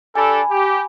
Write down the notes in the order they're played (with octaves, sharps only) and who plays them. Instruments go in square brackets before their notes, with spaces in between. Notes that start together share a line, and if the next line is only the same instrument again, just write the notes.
[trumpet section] D4 G4 A4 [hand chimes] G#5 B5
[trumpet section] G4